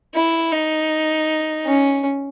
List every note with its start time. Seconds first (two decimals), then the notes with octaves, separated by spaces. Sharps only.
0.14 E4
0.52 D#4
1.65 C#4